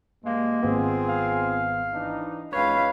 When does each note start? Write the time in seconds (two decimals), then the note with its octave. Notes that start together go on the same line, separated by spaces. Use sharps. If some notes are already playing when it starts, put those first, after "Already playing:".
0.24 G2 G#3 A#3
0.63 G#1 B3 C4 F4 G#4
1.08 F5
1.93 E3 D4 D#4
2.53 C#2 B4 C#5 F5